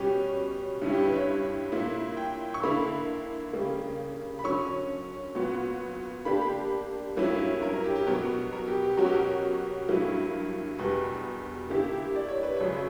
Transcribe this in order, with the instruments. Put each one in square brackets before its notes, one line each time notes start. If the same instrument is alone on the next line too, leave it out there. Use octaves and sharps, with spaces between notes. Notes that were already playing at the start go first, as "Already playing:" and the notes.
Already playing: [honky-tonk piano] B2 G3 C#4 [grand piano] G4
[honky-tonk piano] G2 D3 G3 C#4 E4
[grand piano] G4
B4
C#5
[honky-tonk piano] A#2 A#3 E4
[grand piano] G5
C#6
[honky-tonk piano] D3 A#3 E4 [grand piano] B5
[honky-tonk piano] C#3 G3 A#3
[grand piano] B5
[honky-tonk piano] D3 F#3 C#4 [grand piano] C#6
[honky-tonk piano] A#2 F#3 B3 F#4
[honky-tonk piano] D3 A#3 D4 G4 [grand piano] B5
[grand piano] B5
[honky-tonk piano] G2 F#3 A#3 C#4 E4
[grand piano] A#4
A#4
G4
G4
[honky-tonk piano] B2 F#3 B3 [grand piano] A#4
[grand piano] A#4
G4
G4
[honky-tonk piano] B2 F#3 C#4 F#4 [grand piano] A#4
[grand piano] G4
A#4
[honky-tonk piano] G2 F#3 A#3 E4
[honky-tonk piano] E2 B2 G3 [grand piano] B4
[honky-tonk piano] D3 A#3 E4 G4
[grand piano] D5
C#5
B4
[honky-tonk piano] F#2 C#3 F#3 [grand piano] C#5